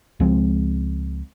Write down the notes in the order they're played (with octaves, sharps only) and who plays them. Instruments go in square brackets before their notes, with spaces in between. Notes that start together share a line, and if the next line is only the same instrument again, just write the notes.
[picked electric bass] C#2 F3 G#3 C4